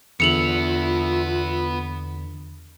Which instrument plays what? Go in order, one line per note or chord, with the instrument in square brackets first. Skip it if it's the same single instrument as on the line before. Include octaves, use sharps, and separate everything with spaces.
[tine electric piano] E2 D3 [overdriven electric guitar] B3 E5 [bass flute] F4 [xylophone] C#7 F7 F#7